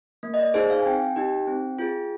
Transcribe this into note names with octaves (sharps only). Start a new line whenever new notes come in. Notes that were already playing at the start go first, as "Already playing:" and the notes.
A#3
D#5
D5
D#4 G#4 C5
F5
G#5
C4 G5
D#4 G4
C4
F4 G#4